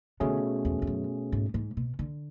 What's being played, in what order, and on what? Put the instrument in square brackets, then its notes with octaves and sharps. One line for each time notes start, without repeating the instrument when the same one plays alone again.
[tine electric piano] B2 A3 C#4 G#4 [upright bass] D3
[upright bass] E2
E2
F#2
G#2
G#2
B2
D3